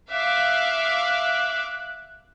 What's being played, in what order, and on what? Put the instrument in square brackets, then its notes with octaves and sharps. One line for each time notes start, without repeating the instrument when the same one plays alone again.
[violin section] E5 F5 D6 [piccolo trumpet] F#6